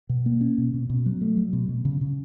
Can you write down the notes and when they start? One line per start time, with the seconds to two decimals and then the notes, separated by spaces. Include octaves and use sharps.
0.09 B2
0.26 A#3
0.41 C#4
0.58 B2
0.74 B2
0.90 B2
1.06 F#3
1.21 A3
1.37 F#3
1.53 B2
1.69 B2
1.85 C#3
2.01 C#3